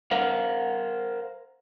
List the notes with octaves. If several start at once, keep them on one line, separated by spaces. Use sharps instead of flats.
A#4 C5 F5 F#5